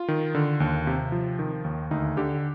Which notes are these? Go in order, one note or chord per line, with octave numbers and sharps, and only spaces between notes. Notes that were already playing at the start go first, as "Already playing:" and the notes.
Already playing: F4
D#3
D3
D#2
C3
F3
D#3
D#2
D2 D#4
D3 G4